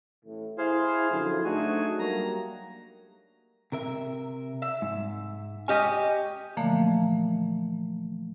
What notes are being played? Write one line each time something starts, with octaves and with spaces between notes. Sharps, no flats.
A1 A2
E4 G#4 C5 F5
F#2 D3 F3
A3 D4 D#4 F#4 G#4 G#5
F#3 G3 A#3 A#5
C3 A#4 E5
E5
G#2
C#4 G4 D#5 G#5
A#2 D3 E3 F3 A3 A#3